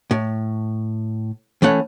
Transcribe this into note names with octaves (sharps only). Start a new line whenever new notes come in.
A2
E3 A3 C#4 F#5